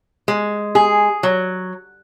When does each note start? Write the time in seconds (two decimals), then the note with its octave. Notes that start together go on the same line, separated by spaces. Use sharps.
0.28 G#3
0.75 G#4
1.23 F#3